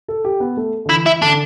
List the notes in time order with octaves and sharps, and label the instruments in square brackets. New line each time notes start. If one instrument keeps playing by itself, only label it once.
[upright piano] A4
G4
B3
A3
D3
[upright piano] E3 [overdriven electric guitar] E4
[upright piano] E3 [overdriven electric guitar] E4
[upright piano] D3 [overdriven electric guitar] D4